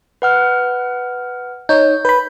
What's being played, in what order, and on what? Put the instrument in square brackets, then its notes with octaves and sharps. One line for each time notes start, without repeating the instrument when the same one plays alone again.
[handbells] B4 F#5 F6
[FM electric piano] D#4 C#5 [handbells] G6
[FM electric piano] B4 B5 [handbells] G6